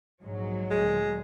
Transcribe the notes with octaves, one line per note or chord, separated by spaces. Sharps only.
A#1 G#2 F#3
D2 A#2 G#3